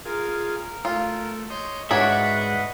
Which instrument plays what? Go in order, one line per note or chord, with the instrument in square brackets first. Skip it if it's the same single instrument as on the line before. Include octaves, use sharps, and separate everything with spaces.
[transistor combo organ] F4 G#4 [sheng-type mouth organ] A#4
[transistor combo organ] A3 [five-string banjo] F4
[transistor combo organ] C#5 D#5 [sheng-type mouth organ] C6 G6
[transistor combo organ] G#2 [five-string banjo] D4 F#4 C#5 [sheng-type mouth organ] B4 D#5 F#5 [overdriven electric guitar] E5